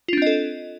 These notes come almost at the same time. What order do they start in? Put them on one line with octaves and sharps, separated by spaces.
F4 D4 C4 D#5 A4